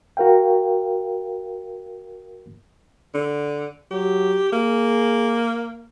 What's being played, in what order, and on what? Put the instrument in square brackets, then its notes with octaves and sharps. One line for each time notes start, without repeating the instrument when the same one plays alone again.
[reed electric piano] F#4 A#4 F5 G5
[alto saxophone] D3
[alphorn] F#3 [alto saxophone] G4
[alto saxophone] A#3 [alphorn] G#4